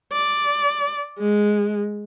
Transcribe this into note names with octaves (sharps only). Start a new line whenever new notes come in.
D5
G#3